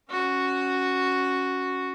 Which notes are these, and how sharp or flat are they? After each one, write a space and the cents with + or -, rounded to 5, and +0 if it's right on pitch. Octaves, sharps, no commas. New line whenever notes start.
C#4 +0 F#4 +0